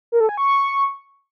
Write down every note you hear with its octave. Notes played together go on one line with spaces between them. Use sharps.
A#4
A4
G#5
C#6